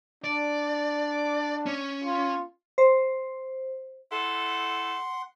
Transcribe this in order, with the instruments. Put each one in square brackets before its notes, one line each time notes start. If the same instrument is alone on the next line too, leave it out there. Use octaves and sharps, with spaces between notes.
[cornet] D4 [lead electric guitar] D5
[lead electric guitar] C#4
[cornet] F4
[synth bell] C5
[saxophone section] A3 E4 A4 [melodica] F#5 C6